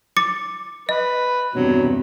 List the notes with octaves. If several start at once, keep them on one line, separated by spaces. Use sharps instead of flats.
D6 A6 C#7
B4 D#5
E2 G2 C3 F#3